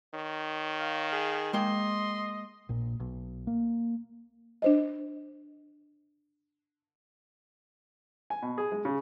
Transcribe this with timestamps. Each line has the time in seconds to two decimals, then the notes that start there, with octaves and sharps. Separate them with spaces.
0.14 D#3 C#5
0.80 F5
1.12 G#4
1.53 G#3 A#3 D#5 G5 C6
2.69 A#1 A#2
3.00 B1
3.47 A#3
4.62 D4 C5 D#5
8.30 G#5
8.42 B2
8.58 G#4
8.72 G#3
8.85 C#3